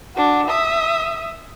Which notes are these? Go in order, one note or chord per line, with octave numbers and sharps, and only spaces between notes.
D4 F#4
E5 D#6